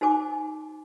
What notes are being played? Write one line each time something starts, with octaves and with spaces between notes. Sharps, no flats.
D#4 F#4 C5 G#5 D6